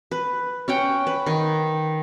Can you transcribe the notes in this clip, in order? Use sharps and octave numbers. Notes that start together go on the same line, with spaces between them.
B4
C#4 F#5 G5
B4
D#3